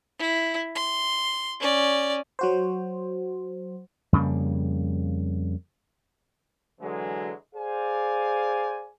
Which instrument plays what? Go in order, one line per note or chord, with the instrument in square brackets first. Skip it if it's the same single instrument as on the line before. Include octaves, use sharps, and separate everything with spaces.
[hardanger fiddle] E4
C6
C#4 D5
[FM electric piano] F#3 F#4 C5
[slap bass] F2 C#3 G3 A#3
[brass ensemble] D3 E3 F#3 G#3
G#4 C5 D5 F5 G#5